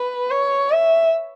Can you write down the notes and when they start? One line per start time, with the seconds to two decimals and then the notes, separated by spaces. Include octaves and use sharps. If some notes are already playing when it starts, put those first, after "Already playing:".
Already playing: B4
0.31 C#5
0.72 E5